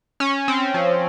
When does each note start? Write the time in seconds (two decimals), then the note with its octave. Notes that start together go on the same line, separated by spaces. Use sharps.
0.20 C#4
0.48 C4
0.74 F3